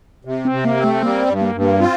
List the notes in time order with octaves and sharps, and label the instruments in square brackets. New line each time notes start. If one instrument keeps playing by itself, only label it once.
[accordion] C3
[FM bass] C4
[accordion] C3
[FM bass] A#3
[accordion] C4
[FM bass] A3
[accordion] G3 [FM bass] A#3
[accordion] G2
[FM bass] A#3
[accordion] G2
[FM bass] A#3
[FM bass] C4 [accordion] F4